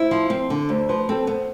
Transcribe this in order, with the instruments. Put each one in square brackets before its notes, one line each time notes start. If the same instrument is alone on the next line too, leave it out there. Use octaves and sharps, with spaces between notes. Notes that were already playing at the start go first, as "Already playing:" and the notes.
Already playing: [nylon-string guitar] E4 [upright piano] C5
[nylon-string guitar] F3
C4
D3
[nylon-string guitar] D2 [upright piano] C5
[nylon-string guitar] F3 [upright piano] B4
[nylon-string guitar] C4 [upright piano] A4
[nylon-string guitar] B3 [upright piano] C5